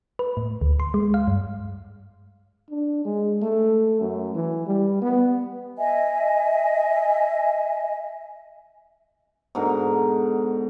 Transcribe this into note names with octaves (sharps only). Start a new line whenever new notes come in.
B4
A2
D2
C6
G#3
F5
G2
D4
G#3
A3
F#2
E3
G3
B3
D#5 E5 G#5
G#2 B2 D3 A#4